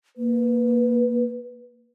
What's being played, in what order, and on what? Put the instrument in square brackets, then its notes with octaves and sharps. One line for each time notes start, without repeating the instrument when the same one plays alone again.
[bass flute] A#3 [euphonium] B4